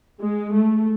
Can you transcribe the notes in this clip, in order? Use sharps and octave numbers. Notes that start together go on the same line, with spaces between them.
G#3
A3